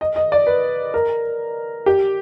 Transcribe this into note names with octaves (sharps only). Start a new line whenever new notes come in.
D#5
D#5
D5
B4
A#4
G4